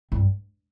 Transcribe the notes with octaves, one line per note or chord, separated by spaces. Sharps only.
G2